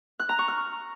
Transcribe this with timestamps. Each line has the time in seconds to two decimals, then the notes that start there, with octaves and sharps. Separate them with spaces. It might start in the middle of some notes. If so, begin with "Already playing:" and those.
0.20 F#6
0.29 A#5
0.39 C#6
0.48 F6